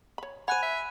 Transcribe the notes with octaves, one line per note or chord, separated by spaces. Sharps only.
C#5 B5
C5 F#5 G#5 B5 F#6 D#7
E5